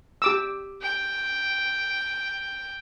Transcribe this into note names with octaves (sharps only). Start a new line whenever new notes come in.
G4 D6 E6
G5